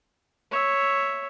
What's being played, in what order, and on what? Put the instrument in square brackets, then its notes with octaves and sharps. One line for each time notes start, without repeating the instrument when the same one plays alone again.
[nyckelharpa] C#5 E5